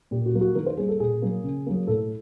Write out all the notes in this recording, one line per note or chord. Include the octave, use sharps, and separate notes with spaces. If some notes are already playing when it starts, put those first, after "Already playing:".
A#2 G4
F#4
F#3 A#3
F#4
D#3 A#4
C5
G3 A#3 G#4
A4
A#2 G#4
F#3 A#3
C#3
F#3 A#3
A2 A4